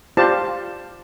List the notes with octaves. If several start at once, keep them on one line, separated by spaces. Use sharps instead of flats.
F4 G4 C5 D5 A5